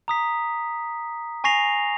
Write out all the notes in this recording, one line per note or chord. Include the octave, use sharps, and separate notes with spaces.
A#5 D#6 B6
G#5 C#6 A#6 C7 F7